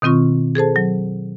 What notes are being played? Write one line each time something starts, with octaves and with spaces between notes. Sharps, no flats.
B2 D#3 C4 F4 C#6
G#4 A4 C5 A5
F#3